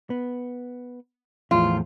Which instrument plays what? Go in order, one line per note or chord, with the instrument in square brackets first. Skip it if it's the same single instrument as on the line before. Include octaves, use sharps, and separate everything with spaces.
[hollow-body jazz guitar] B3
[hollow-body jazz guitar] E2 A2 F3 [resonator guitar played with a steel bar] F4